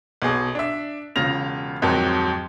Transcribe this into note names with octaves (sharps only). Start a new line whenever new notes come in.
B1 B2 G#4
D4 E5
E1 C#3 F4 A#6 F7
D1 F2 G#2 F#3 A#4 A5